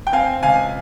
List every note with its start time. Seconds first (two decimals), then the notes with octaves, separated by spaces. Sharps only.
0.07 G5
0.13 C4 F5 G#5
0.43 C#2 F5 G#5